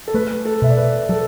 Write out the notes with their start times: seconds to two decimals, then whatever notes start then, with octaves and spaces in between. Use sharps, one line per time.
0.08 A4
0.14 A3 B4
0.45 A4
0.62 B2 E5
0.70 D5
0.77 B4
1.09 F#3 A4